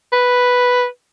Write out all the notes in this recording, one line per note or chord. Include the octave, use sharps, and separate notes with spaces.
B4